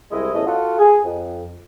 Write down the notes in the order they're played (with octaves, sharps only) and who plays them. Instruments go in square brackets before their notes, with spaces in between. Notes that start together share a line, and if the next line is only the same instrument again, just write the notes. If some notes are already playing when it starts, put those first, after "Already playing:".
[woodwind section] C2 G#3 E4 D#5
E2 A2 A3 C#4 D#5
F4 F#4 A4
G#4 G#5
F2